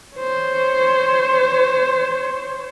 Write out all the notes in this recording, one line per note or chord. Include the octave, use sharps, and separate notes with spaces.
C5 C#5